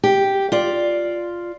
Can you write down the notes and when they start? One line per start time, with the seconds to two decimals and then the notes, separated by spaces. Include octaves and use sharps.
0.03 G4
0.52 F4 D5